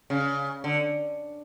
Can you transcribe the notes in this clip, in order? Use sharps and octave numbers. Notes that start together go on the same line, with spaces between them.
C#3
D3